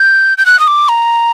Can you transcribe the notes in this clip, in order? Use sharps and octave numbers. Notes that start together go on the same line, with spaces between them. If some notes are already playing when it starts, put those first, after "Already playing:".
Already playing: G6
G6
F#6
D#6
D6
A#5